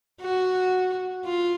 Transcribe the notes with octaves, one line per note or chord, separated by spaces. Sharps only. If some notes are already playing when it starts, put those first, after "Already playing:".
F#4
F4